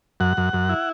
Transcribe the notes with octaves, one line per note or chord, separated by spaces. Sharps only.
F#2 F#5
F#2
F#2
E4